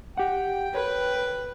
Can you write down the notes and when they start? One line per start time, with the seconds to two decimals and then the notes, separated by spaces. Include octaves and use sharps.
0.17 G4 F#5 G5
0.75 B4 C#5